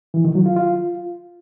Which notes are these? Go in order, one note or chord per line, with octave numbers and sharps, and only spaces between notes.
E3
D#3
F#3
F4
F4